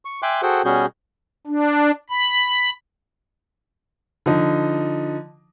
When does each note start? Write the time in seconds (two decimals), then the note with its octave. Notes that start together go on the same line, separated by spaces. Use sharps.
0.05 C#6
0.22 E5 G5 G#5 C6 D6 F#6
0.42 F#4 G#4 A4 C5 F#5 G5
0.65 B2 G3 C#4 F#4 G#4 G6
1.47 D4
2.10 B5
4.26 D3 F3 D#4